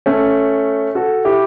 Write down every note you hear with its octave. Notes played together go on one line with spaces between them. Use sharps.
A3 C#4
F#4 A4
E4 G4